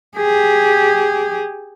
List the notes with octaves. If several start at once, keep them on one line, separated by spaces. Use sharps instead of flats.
G4 G#4